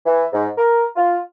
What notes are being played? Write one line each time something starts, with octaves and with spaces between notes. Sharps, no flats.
E3
G#2
A#4
F4